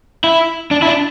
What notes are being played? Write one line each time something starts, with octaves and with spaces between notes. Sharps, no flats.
E4
D4
E4
D4